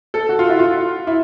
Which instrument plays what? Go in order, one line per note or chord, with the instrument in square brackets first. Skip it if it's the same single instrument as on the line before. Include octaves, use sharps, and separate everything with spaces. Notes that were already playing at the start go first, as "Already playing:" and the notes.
[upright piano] A4
F#4
F4
E4
F4
E4